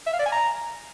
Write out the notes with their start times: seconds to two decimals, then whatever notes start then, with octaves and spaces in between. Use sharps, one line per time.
0.07 E5
0.13 F5
0.19 D5
0.26 G#5
0.32 A#5